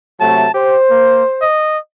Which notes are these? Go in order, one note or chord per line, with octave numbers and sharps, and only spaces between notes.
C3 F#3 A3 A5
G4 C5
A#3
D#5